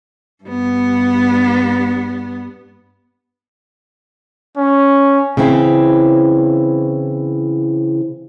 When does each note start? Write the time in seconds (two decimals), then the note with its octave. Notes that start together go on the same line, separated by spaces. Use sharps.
0.44 G2 B3
4.57 C#4
5.37 C#3 E3 C4 E4